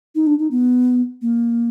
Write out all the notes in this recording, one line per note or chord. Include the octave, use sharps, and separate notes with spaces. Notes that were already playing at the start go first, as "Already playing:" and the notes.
D#4
D4
D#4
B3
A#3